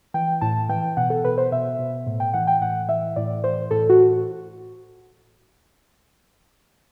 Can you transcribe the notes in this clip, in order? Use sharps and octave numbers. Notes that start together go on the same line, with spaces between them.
E3 G5
A2 A5
E3 G5
B2 F#5
A4
B2 B4
C5
B2 E5
B2
A2
G5
E3 F#5
G5
A2 F#5
E3 E5
A2 D5
E3 C5
A2 A4
F#4